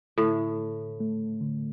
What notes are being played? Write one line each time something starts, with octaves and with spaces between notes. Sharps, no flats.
A2 D3
A3
A3
D3